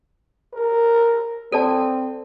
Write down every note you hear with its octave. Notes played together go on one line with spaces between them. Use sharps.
A#4
C4 A4 D5 A5